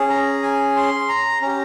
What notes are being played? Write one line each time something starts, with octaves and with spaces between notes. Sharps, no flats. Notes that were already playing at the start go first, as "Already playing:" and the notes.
Already playing: C#4 G#4
A#5
G#5
C6
A#5
C#4 G4 A#5